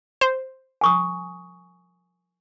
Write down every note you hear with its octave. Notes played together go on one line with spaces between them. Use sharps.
C5
G#5 C#6 D#6